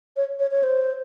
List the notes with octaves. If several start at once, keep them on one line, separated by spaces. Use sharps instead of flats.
C#5
C#5
C#5
C5